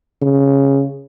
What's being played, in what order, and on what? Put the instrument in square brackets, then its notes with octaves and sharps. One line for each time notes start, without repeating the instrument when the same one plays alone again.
[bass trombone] C#3